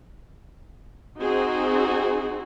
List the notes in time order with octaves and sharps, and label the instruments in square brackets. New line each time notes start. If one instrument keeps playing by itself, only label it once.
[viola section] C4 D#4 F#4 G#4